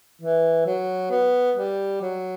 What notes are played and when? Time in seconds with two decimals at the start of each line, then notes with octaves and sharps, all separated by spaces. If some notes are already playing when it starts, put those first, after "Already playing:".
0.22 E3
0.66 F#3
1.11 B3
1.57 G3
2.02 F#3